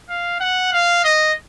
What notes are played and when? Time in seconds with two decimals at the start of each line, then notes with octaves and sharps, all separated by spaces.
0.09 F5
0.40 F#5
0.73 F5
1.04 D#5